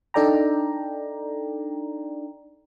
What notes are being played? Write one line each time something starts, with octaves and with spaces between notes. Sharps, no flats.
D4 D#4 A4 D5 G5 A#5